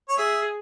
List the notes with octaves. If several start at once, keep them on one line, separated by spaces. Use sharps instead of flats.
C#5
G#4 E5